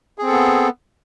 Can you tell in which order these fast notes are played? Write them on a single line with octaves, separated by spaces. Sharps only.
G#4 C4 A4 B3